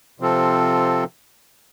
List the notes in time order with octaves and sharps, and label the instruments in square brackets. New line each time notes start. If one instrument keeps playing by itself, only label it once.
[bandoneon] C3 F3 C4 F4 A4